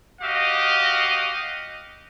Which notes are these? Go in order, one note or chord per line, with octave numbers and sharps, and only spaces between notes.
F#4 G4 D#5 F5